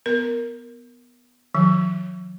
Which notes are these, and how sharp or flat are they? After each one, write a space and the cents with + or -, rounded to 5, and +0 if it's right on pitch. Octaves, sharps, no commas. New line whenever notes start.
B3 +0 A#4 +0
D#3 +20 F#3 -40